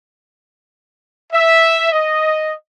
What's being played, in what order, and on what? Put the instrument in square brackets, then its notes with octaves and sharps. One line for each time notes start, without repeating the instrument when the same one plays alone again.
[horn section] E5
D#5